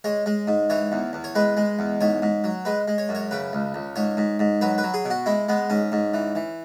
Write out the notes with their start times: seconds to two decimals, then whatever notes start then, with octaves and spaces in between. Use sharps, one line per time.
0.04 G#3 C#5
0.26 G#3
0.48 G#2
0.70 E3 C#5
0.92 E2
1.13 E2
1.24 C#5
1.35 G#3 B4
1.57 G#3
1.79 E2
2.01 G#2 C#5
2.22 G#2
2.44 F#3
2.65 G#3 B4
2.88 G#3
2.98 C#5
3.09 F#2
3.15 C#5
3.31 C#3 B4
3.53 C#2
3.74 C#2
3.96 G#2 C#5
4.17 G#2
4.39 G#2
4.61 F#3 B4
4.78 B4
4.83 F#3
4.94 G#4
5.05 B2
5.10 F#4
5.26 G#3 E4
5.49 G#3 B3
5.70 G#2 C#4
5.92 G#2
6.14 E3
6.35 E3